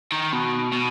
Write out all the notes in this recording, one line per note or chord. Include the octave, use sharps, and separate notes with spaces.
D#3
B2
B2